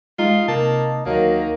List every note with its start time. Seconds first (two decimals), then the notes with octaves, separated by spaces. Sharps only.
0.19 G#3 D#4 F4 G#4 A#5
0.48 C3 A#3 A5
1.06 D2 D#3 F#3 A#3